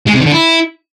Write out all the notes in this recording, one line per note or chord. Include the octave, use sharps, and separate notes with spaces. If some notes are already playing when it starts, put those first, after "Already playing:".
G#3
C3
D#3
D3
E4